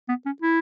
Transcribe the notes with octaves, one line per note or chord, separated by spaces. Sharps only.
B3
C#4
E4